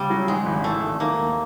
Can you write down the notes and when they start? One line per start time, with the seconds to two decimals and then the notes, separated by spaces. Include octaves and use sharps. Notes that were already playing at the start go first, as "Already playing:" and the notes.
Already playing: C#3 G3
0.10 F#3
0.28 G#2 G#3
0.46 G#1
0.64 E3 A3
0.82 G#1
1.00 D#3 A#3
1.19 D#2